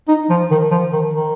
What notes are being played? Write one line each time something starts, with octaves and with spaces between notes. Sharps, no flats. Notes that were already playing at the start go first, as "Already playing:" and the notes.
D#4
F3
D#3
F3
D#3
D#3